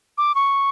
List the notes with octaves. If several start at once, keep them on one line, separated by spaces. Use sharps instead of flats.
D6
C#6